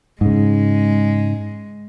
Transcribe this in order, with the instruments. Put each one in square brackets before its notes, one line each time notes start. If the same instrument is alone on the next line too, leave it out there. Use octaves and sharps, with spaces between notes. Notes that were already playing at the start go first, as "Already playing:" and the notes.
[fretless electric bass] G#2 C#3 [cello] G#3